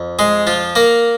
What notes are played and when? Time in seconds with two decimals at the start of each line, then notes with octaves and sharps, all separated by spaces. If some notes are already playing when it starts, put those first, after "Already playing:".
Already playing: F2
0.19 G#3 G#4
0.47 F3 F4
0.76 A#3 A#4